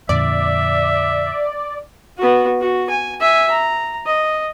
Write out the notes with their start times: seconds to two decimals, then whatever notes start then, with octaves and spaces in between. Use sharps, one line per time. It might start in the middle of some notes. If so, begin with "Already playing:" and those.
0.09 F2 A#2 D3 D5 E5
2.18 B3 F#4
2.61 F#4
2.90 G#5
3.20 E5 G#5
3.51 A#5
4.06 D#5